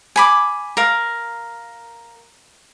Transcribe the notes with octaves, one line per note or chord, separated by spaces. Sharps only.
G#5 B5 D6
A#4 F5